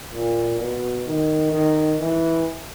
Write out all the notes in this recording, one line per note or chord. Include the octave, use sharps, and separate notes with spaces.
A#2
B2
D#3
D#3
E3